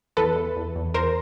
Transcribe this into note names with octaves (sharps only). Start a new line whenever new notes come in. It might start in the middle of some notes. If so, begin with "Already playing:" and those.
E2 A4 B4
E2
E2
E2
E2 A#4 C5